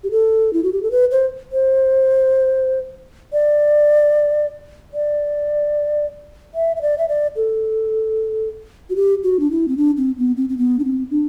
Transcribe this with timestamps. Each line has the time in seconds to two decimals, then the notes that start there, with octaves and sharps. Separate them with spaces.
0.04 G4
0.11 A4
0.53 E4
0.64 F#4
0.73 G4
0.83 A4
0.91 B4
1.11 C5
1.52 C5
3.33 D5
4.94 D5
6.54 E5
6.76 E5
6.82 D5
6.98 E5
7.09 D5
7.36 A4
8.90 F#4
8.96 G4
9.24 F#4
9.40 D4
9.51 E4
9.68 C4
9.77 D4
9.97 C4
10.18 B3
10.37 C4
10.49 C4
10.58 B3
10.79 D4
10.85 C4
11.11 D4